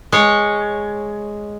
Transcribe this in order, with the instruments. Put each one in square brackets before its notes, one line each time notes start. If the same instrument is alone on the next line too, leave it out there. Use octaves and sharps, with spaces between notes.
[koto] G#3 C#5